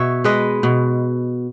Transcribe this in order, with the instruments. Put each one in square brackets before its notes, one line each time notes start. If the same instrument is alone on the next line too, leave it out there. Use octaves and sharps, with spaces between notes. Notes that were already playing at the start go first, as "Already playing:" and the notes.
Already playing: [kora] B2 C#5 E5
G#3 B4 D#5
B2